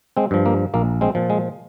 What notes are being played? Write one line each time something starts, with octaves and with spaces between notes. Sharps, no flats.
G#3 C4
G2 F3
A#3
A#1 A#3
G#3 C4
A#2 F3
G#3